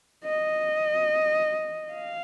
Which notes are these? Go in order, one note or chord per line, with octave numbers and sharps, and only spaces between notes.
D#5
F5